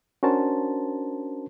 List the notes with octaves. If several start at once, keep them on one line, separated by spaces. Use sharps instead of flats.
C#4 D4 F#4 A#4 C5 A5